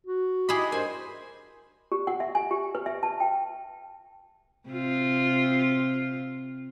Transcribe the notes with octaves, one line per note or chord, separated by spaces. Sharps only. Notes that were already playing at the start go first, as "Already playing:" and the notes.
F#4
E4 G4 G#4 D#5 B5
G2 A#4 C5 G#5
G4
F#5
E5
G#5
G4
B4
E5
A5
G5
C3 F4